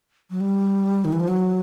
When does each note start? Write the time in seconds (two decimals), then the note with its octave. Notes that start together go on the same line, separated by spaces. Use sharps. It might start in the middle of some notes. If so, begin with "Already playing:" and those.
0.30 F#3
0.40 G3
1.05 D#3
1.12 E3
1.20 F3
1.28 F#3